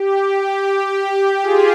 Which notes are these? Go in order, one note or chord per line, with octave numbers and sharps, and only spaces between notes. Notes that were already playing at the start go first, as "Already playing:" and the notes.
Already playing: G4
G4
F4 G#4